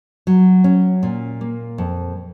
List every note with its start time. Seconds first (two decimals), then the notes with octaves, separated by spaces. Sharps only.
0.27 F#3
0.64 C#4
1.03 A#2
1.41 A#3
1.78 F2